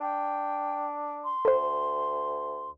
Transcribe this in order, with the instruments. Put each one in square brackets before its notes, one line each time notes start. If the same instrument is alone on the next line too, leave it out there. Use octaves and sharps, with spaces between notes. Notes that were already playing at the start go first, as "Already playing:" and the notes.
[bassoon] D4 [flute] G5
[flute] C6
[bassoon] D2 [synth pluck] A4 C5